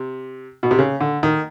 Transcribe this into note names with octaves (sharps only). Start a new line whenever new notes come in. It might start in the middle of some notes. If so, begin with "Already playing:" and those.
Already playing: C3
B2
C3
C#3
D3
D#3